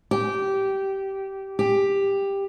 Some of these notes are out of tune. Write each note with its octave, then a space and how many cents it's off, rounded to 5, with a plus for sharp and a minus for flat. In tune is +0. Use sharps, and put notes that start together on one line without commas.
G4 -15
G4 +10